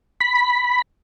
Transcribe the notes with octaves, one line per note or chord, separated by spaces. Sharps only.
B5